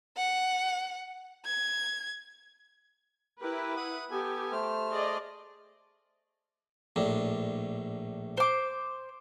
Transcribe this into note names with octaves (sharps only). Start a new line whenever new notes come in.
F#5
G#6
E4 G4 A#4 B4
F#5 D#6
B3 G4 A4 G#5
A3 C5 F6
G#4 D5 D#5
A#1 A2 D4
C5 D6